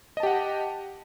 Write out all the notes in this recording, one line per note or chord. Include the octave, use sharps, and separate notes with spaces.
G4 D#5 F#5 A5